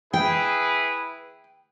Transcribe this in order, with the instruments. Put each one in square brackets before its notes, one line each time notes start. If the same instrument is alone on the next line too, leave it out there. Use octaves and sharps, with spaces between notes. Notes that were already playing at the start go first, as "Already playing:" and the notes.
[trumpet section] E4 G#4 B4 [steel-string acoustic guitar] G5